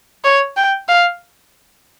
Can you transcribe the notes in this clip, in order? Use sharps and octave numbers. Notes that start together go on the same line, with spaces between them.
C#5
G5
F5